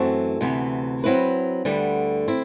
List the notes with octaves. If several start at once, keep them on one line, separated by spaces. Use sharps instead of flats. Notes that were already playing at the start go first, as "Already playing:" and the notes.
Already playing: F#2 E3 A3 C4 F#4
D2 C3 E3 B3
F#3 C4 E4 B4
D2 D3 G3 B3
C4 E4